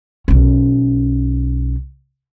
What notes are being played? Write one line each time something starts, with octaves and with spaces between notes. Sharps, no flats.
B1 C#4